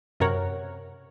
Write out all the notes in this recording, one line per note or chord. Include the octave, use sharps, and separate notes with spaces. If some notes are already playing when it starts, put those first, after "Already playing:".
F#2 C3 A#4 C#5 F#5